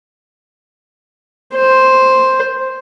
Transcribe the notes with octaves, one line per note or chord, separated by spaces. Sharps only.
C5